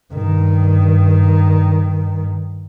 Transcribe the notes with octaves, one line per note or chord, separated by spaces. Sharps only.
G2 D#3